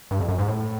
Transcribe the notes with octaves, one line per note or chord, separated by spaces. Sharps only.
G2
F2
F#2
G#2
A2